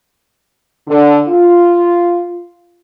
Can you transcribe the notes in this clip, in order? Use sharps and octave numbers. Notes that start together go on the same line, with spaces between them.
D3
F4